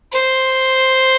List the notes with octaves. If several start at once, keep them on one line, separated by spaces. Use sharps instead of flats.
C5